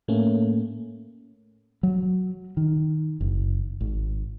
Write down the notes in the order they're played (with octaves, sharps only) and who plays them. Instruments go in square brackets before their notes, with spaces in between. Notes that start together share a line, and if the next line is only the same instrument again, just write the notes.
[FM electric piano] A2 A3 A#3 C#4
[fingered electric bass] F#3
D#3
F#1
G#1